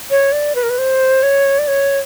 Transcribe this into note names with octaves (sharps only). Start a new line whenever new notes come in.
C#5
D5
B4
A#4
B4
C5
C#5
D5
C#5